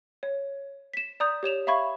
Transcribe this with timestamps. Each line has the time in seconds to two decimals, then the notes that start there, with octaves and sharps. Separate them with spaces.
0.23 C#5
0.94 B6 E7
1.20 D5 A#5 D#6 G6
1.43 G4 C#5 E7 F7
1.67 E5 F5 B5 C#6 G#6